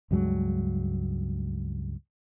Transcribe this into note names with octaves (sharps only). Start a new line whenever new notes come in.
C#2 G2 F#3 G#3